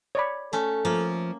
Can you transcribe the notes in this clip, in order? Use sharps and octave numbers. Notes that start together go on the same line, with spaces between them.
C#5 D5 B5
A3 C#4 A4
F3 A3 A#3